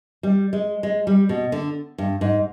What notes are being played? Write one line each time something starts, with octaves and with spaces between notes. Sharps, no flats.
G3
G#3
G#3
G3
B2
D3
G2
G#2